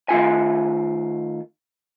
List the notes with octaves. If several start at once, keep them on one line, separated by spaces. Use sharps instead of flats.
D#3 A3 F4 G#5